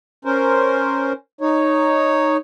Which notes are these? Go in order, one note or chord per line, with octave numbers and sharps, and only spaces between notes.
C#4 A#4 C5
D#4 C#5